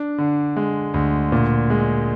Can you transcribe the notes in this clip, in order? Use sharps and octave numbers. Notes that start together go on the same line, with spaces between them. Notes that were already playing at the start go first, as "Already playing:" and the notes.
Already playing: D4
D3
G#3
D2
A#2
G#3